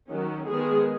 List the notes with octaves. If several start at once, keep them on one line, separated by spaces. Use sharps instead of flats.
D#3 F#3 C#4
D#3 G#3 B3 G#4